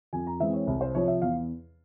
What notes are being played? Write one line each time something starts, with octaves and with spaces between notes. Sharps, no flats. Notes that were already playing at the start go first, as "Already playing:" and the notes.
F2 G#5
A#5
E3 G#3 C4 E5
C#5
C2
C5
C3 F3 C#5
E5
E2 F5